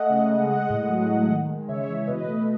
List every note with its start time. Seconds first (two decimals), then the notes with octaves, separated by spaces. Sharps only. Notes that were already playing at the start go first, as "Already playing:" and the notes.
Already playing: A3 D#5 F#5
0.10 C#3
0.30 G#3
0.49 G#3 D#5 F#5
0.70 A2
0.90 F#3
1.09 A3
1.28 D#3
1.48 G#3
1.69 C#3 C#5 E5
1.88 E3
2.07 B2 B4 D#5
2.27 A3